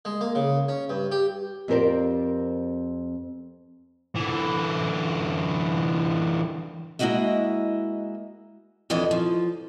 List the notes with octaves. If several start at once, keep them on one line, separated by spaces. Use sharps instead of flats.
G#3
A#3
C#3
C#4
G2
G4
F2 C4 G4 A#4 C5 D5
D3 E3
G#3 A#3 E4 F#4 D#5 E5
F2 E3 C#4 D4 A4 D#5
F3